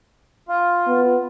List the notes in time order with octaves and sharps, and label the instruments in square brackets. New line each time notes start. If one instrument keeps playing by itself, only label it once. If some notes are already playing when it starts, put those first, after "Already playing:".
[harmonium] F4
[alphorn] B3